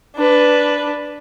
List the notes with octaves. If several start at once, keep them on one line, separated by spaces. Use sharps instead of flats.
D4 B4